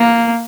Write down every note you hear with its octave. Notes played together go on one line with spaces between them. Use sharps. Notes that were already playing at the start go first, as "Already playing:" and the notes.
Already playing: A#3